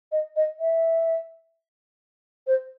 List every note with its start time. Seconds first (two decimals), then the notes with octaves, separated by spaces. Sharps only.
0.11 D#5
0.36 D#5
0.59 E5
2.46 C5